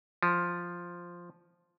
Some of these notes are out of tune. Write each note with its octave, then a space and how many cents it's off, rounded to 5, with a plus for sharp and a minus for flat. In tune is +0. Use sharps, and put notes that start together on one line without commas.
F3 +0